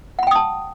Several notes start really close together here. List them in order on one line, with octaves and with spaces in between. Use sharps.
F#5 B5 G5 D#6 A5